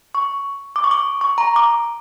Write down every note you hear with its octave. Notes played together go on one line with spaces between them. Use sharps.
C#6
D6
C#6
D6
C#6
A#5
D6